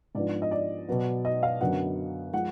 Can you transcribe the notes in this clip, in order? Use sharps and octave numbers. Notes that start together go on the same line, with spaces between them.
G#2 F3 B3 D4 D5
D#5
D5
B2 F#3 B3
D#5
F5
F#2 D3 F#3 B3 F#5
F3 G#3 F#5